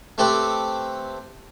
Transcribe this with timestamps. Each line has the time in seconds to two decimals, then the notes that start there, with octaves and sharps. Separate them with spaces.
0.18 A3 C4 G4 A4 B4